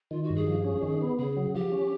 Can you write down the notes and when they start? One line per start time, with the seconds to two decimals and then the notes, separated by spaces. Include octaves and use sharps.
0.11 D#3 F4
0.23 F#4
0.30 G2
0.36 G#4
0.47 F3
0.65 C#4
0.83 D#3
1.01 B3
1.18 C#3 G#4
1.37 F#3
1.55 F3 G4
1.72 C#4